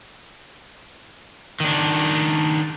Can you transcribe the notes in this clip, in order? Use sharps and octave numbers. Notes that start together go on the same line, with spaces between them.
D#3 D4